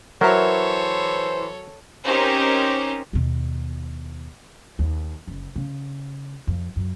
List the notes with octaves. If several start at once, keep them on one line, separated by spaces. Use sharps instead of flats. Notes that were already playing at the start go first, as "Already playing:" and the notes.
E3 F#3 A4 A#4 C5 C#5 E5 A#5
C4 C#4 D#4 G4 A#4 C5
D#2 B2
D#2
F#1
C#3
F2
F#2